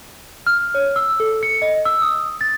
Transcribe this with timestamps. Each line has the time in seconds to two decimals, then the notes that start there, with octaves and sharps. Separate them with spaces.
0.47 F6
0.75 C#5
0.96 E6
1.20 A4
1.43 C#7
1.62 D#5
1.85 E6
2.02 D#6
2.41 A6